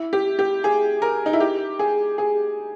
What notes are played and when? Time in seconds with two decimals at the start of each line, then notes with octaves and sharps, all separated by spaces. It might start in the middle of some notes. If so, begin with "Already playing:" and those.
Already playing: E4
0.13 G4
0.39 G4
0.64 G#4
1.02 A#4
1.26 D#4
1.33 E4
1.40 G4
1.79 G#4
2.18 G#4